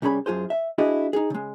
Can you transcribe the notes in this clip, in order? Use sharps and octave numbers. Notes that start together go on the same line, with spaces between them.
C2 G3 C#4 G#4 B5
F#2 F4 G#4 C5
E5
D4 E4 F#4 G#4 D#5
D#4 G#4
C#3 G#3